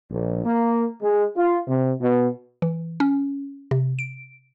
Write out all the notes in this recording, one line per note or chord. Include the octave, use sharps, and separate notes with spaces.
A#1
A#3
G#3
F4
C3
B2
E3
C#4
C3
D7